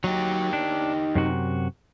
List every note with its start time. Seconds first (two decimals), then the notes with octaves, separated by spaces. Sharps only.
0.04 F#3 D#4 G4
0.53 D4
1.15 F#2 C3 F#4